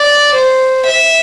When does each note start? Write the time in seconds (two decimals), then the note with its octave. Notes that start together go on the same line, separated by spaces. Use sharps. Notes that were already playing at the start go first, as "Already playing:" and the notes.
Already playing: D5
0.34 C5
0.85 E5